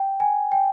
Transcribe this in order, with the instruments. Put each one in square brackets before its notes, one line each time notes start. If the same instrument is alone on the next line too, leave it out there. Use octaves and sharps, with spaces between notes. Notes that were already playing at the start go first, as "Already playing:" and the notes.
Already playing: [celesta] G5
G#5
G5